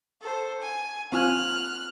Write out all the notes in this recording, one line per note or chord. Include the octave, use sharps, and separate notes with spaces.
A4 C5
G#5
C4 F4 G#5 F6 F#6